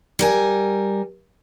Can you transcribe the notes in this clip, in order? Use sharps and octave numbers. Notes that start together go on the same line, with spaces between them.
G3 A#4 G#5